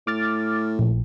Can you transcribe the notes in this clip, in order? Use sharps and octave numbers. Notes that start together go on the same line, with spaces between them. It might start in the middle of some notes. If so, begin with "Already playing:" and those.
A2 D6 F6 A6
A#1